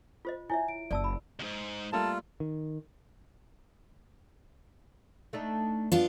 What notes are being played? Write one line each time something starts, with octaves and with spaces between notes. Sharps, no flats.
F4 C5 D#5
E4 C#5 E5 G#5
D7
F#1 D5 A5 E6
B5
D#2 G#2
G3 A3 A#3 F4 A5
D#3
A3 D4 D#4
B3 D4 F4